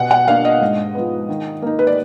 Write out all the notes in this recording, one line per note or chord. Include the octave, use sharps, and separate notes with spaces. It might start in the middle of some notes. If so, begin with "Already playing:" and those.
Already playing: B2 F#5
F#5
A#3 D4 F5
D#5
G#2
F3 B3
D#3
A#3 D#4
B4
D5